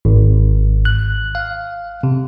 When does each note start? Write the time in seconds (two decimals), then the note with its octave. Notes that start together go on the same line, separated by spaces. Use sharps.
0.05 G#1
0.85 F#6
1.35 F5
2.03 C3